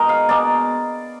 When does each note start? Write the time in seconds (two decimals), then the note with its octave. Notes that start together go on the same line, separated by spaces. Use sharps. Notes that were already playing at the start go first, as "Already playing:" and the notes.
Already playing: B2 G#3 D#4 A#4
0.09 F5
0.29 B2 G#3 D#4 D5